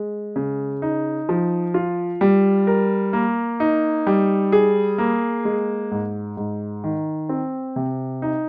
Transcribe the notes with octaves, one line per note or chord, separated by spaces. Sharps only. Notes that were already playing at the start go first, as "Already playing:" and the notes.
Already playing: G#3
C#3
D#4
F3
F4
G3
A#4
A#3
D#4
G3
G#4
A#3
G#3
G#2
G#2
D#3
C4
C3
D#4